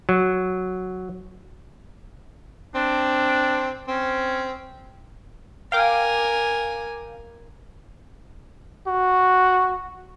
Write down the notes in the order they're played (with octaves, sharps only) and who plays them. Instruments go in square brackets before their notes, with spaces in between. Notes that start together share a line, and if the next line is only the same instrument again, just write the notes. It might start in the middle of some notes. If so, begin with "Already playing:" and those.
[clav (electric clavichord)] F#3
[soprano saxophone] C4 [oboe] D4
[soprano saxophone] C4 [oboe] C#4
[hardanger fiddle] A#4 G#5 [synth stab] F5 G5 D6
[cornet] F#4